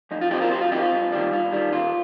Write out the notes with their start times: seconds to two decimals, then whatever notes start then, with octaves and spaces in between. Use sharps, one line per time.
0.11 F2 D#4
0.21 F4
0.30 F3 C4 D#4 G4
0.41 F4 A#4
0.51 F2 G4 C5
0.61 F4
0.72 F3 C4 D#4 G4
0.82 F4
0.91 G2
1.12 D#3 G3
1.32 G2 F4
1.52 D#3 G3
1.72 D#2 F4